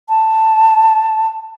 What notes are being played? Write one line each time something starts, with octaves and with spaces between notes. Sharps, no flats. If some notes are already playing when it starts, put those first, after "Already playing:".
A5